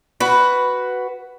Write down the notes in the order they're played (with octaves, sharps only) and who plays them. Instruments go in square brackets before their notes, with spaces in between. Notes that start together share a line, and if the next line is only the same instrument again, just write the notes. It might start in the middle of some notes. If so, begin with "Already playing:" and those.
[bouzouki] F#4 B4